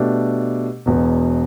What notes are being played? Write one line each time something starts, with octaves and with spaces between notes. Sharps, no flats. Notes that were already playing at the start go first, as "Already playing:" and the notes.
Already playing: B2 A3 D4 G4
E1 E2 B2